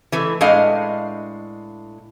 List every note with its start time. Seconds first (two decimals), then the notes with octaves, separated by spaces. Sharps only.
0.12 E3 A3
0.41 A2 G#3 D4 D#5 F5